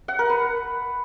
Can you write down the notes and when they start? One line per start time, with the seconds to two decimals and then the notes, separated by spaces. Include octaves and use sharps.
0.08 F#5
0.19 A#4
0.30 B4